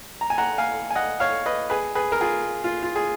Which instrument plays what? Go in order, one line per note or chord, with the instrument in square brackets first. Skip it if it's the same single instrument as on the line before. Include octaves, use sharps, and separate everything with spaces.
[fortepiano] A#5
G#5
F#5 A#5
F5 G#5
G#5
D#5 F#5
C#5 F5
B4 D#5
G#4 B4
G#4 B4
A#4
F4 G#4
F4
F4
G#4